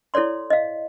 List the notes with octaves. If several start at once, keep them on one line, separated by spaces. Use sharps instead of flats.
E4 A4 C#5 D5 C6
D#5 F5